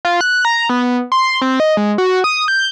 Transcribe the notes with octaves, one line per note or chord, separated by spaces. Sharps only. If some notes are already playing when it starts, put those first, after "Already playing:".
F4
F#6
A#5
B3
C6
C4
D#5
G#3
F#4
D#6
G6